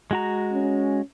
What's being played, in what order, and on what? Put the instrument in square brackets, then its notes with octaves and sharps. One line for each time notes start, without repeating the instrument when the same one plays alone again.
[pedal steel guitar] G#3 F#4 A#5
[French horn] C#4